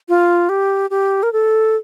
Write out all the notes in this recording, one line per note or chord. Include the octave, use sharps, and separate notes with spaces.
F4
G4
G4
A#4
A4